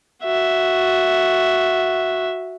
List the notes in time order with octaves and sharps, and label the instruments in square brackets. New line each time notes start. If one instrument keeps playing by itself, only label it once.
[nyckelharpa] F#4 E5